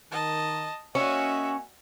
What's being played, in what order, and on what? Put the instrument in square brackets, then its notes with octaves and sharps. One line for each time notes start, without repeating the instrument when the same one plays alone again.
[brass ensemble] D#3 [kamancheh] D#5 A5
[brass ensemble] A#3 D#5 G#5 [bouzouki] C#4 [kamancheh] F#4 E5